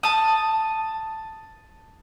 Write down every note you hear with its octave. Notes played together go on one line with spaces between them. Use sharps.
A5 D#6